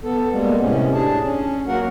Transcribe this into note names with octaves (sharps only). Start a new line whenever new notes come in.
B3 A4
G3 G#3 A#3 B3
A2 C3 C#4
D4 G#4 A5
C#4
F#3 A#3 F#4 A#4 F#5